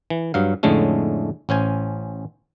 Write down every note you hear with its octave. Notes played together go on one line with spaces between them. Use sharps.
E3
G2 F#3 F5
F2 A2 D3 G#3 A3 C#4
A1 C#4 C5 G#5